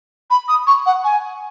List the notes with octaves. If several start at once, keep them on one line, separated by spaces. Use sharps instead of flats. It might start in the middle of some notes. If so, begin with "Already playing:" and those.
B5
D#6
C#6
F#5
G#5